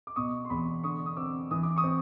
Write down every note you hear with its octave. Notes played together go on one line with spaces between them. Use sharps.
D6
B2 C#6 D#6
C6
E2 B5 C#6
D3 C#6 D#6
D#6
C4 D6 E6
E3 D#6
D6
C#6 D#6
C4